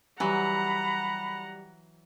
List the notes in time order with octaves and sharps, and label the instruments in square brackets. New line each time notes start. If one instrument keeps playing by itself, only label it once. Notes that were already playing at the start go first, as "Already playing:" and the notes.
[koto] E3 F#3 [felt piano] G3 [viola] F#5 A#5 [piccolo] B5